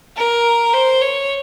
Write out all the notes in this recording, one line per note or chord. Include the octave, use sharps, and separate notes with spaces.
A#4
C5
C#5